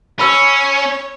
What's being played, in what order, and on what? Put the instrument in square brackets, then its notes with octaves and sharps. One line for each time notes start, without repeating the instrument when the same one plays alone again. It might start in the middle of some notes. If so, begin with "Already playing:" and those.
[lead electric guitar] C#4 [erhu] C#5 [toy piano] B5 C6 E6